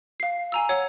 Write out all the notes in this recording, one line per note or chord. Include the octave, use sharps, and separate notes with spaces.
F5 C7
G#5 A#5 E6
C#5 F#5 E6